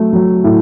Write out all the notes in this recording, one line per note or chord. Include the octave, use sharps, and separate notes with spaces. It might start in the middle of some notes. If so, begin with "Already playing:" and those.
Already playing: F#3 A3
F#3
A2